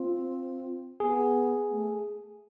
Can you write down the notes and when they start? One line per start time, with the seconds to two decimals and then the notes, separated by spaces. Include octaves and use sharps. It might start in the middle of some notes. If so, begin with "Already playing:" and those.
Already playing: C4 F4
1.00 B3 G#4
1.70 A3